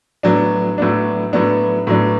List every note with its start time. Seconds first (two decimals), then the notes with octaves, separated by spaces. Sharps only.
0.23 A2 F#3 B3 D4
0.78 A2 F#3 B3 D4
1.33 A2 F#3 B3 D4
1.87 A2 F#3 B3 D4